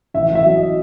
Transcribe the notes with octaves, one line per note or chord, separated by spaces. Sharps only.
A1 E5
A1 E5
F#3
D#5